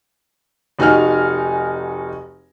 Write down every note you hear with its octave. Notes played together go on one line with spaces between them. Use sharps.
F1 D#4 F#4 G#5 F6